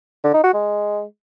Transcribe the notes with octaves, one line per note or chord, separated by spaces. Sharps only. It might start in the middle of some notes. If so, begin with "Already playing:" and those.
D3
D#4
F#4
G#3